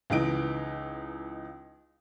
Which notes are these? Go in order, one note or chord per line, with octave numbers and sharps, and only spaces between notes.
C#2 E3 D#4 D7